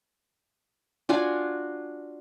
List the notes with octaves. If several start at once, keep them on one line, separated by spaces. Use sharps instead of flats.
D4 F4 F#4 G#5